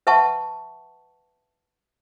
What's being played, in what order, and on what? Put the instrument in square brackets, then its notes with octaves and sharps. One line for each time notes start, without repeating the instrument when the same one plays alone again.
[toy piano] B4 E5 F#5 A5 C#6